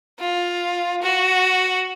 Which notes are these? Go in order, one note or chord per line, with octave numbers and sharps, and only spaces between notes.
F4
F#4